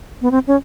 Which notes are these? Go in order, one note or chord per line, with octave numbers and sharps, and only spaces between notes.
B3
C4
C#4